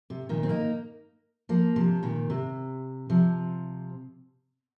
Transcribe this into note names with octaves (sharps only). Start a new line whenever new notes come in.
C3
A#2 D#3
C4
A#3 D#4
F3 A#3
C3 F3
A#2 D#3
C3
C3 F3